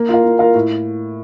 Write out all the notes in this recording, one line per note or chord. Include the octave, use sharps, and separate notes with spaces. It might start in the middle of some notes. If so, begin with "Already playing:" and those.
Already playing: A#3
F4 A#4 F5
A#3
F4 A#4 F5
A2